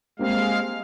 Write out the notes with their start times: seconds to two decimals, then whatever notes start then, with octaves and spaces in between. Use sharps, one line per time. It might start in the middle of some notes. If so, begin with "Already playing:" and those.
0.19 G3 G#3 A#3 C4 F5